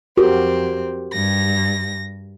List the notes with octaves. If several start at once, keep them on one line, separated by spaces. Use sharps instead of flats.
F2 C4 F#4 G4 A#4
G2 A#6